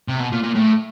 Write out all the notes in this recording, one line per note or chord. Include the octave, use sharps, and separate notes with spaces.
C3
B2
A#2
A#2
A2